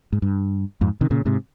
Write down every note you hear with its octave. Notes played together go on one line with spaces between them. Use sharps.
G#2
G2
F2 G#2
C3 D#3
A#2 C#3
G#2 C3